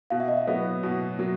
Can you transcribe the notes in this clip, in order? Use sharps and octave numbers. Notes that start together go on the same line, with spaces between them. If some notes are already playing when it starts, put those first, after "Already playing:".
B2 F5
E5
D#5
E5
F#3 B3
B2
F#3